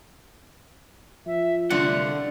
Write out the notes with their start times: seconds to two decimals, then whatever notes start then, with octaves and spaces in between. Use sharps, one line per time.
1.26 F3 E5
1.70 C2 D3 A3 F4 D5 F#5